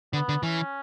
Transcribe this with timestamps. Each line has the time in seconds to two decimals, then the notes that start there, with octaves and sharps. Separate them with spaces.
0.13 D3 B3
0.29 D3
0.43 E3 C#4